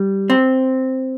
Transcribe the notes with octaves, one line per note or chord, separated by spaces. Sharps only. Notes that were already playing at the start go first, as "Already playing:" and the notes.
Already playing: G3
C4